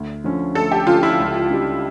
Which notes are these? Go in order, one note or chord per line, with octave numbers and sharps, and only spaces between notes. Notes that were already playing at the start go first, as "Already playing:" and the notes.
Already playing: D2
D3 F3 C#4
D2 A4
G4
D3 F3 C#4 F4
E4
C#2
C#3 G3 D4 G4